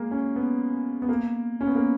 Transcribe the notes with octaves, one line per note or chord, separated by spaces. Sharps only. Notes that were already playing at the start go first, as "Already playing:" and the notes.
Already playing: G#3 A#3
C#4
B3
B3
A#3
C#4
B3
A#3